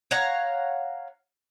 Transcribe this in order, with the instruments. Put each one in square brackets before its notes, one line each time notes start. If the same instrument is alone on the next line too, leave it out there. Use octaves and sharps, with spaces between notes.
[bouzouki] C#5 F5 F#5 A#5